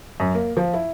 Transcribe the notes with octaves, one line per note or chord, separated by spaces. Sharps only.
F#2
A#3
F3
E4